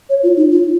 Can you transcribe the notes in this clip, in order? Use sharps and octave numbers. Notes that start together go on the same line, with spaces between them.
C#5
F4
D#4
F4